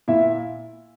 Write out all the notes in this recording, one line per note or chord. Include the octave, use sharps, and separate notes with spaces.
A#2 E4 E5